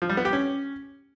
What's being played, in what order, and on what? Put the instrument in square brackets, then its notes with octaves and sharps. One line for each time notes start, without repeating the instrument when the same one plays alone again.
[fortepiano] F3
G3
B3
G4
C#4